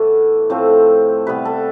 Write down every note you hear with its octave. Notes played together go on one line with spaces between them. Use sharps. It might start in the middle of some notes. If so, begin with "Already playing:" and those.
Already playing: A2 E3 A3 B3 B4
A2 F3 A3 C4 C5
C3 G3 B3 B4
A4